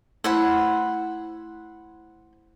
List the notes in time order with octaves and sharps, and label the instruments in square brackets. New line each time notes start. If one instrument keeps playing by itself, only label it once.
[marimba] A3 E4 G#6 [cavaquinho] C5 F#5 B5